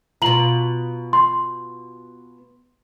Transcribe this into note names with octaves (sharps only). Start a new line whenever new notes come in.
B2 F4 A#5 F#7
C6